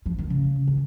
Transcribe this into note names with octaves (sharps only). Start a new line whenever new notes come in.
F3
D#3
C#3
D#3